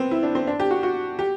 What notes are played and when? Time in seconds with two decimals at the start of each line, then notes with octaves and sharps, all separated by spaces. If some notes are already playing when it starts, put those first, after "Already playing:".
Already playing: B3 C4
0.11 E4
0.23 D4
0.35 C4
0.47 D4
0.60 G4
0.71 F#4
0.83 F#4
1.19 G4